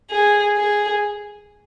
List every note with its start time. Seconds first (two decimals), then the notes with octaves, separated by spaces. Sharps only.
0.11 G#4
0.57 G#4